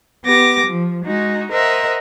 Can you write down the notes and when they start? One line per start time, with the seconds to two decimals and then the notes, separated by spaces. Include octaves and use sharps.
0.24 B3 G4 D6 A#6
0.66 F3
1.04 G#3 D#4 F#4
1.51 A#4 C5 D#5 E5 F#5